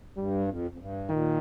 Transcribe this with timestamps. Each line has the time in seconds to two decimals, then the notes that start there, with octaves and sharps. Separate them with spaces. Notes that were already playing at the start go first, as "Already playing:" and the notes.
0.16 G2 G3
0.47 F2
0.71 F2
0.78 G2
1.09 A#2 D#3